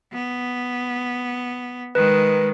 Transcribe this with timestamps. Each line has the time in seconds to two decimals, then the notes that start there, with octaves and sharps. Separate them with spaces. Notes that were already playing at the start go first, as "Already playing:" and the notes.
0.13 B3
1.95 D#3 G#3 B4